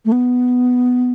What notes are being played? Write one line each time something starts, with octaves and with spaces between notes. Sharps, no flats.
A3
B3